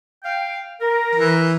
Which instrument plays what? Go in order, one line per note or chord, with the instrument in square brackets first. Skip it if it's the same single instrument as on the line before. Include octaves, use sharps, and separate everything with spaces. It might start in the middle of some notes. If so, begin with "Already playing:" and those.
[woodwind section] F5 G5
A#4
[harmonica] E3